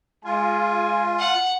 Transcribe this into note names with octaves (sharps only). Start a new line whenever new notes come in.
G#3 F4 G#5
F#5